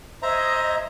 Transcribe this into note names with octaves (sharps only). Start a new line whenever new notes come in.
C5 D#5 E5 A#5 G#6